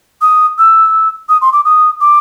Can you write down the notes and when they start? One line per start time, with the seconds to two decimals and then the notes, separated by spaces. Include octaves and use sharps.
0.22 D#6
0.58 E6
1.29 D#6
1.42 C6
1.53 D6
1.65 D#6
2.01 D6